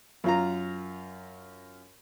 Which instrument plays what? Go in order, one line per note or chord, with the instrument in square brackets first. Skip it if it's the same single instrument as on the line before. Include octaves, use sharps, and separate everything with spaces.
[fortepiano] F#2 F4 A#5